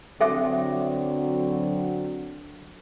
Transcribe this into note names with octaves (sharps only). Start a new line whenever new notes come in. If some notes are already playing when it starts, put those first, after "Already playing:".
D3 F#3 C4 A4 E5 D6